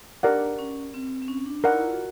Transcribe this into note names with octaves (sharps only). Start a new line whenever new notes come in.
D4 G4 A#4 D5 F#5
C#4
C4
C4
C#4
D4
D#4 A#4 D5 F#5
E4
F4
F#4